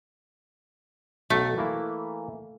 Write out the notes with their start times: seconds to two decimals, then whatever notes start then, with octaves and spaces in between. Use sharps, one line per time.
1.30 B1 A3 A#5
1.57 E3 A#3 E4